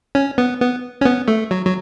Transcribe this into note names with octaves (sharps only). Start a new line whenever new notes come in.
C#4
B3
B3
C#4
B3
A3
F#3
F#3